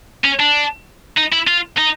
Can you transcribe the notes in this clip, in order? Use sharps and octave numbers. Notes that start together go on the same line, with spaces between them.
C#4
D4
D#4
E4
F4
D#4